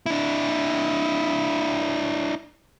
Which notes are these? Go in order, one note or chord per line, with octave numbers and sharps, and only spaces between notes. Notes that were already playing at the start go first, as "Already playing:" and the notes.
D4 E4